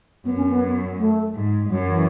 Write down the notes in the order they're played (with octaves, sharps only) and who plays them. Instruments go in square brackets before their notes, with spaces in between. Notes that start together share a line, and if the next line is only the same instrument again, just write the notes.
[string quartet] F#2 [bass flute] B3
[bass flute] C#4
B3
A3
[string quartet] G#2
[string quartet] F#2 [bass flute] F#3
[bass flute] E3